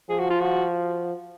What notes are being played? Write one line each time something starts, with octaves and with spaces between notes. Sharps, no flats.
F3 G#4
F#4
F4
F#4